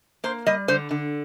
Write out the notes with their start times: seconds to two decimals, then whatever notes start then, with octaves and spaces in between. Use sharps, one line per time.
0.24 A#3 C5
0.46 G3 D#5
0.68 D3 C5
0.91 D3